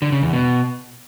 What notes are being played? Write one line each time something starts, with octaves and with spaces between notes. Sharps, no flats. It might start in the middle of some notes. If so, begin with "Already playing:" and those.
D3
C#3
E2
B2